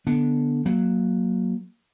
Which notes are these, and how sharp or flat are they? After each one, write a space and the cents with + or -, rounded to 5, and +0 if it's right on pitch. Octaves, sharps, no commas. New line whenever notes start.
D3 +0 B3 -15 D4 -5
F#3 +0 A#3 +0